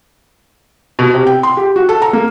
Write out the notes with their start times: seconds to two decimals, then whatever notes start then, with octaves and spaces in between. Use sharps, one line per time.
0.99 B2
1.14 C3
1.27 G5
1.43 C6
1.57 G4
1.76 F#4
1.89 A4
2.02 A#5
2.13 A#3